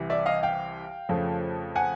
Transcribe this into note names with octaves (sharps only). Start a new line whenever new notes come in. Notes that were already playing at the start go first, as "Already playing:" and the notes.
Already playing: C2 C3 E3 G3
D5 E5
D#5 F5
F5 G5
F2 C#3 F3 A3
F#5 G#5